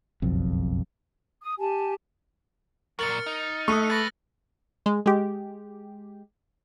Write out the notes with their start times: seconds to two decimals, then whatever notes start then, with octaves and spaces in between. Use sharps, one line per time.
0.22 F#1 B1 F2
1.41 D#6
1.59 G4 G#5 A5
2.99 A#2 F#3 A#4 F6 A6 C#7 F#7
3.26 D#4
3.68 A3 C#6 D#6 E6 F#6 D#7
3.90 G#4 B4 A6 A#6 F#7
4.86 G#3
5.06 G#3 G4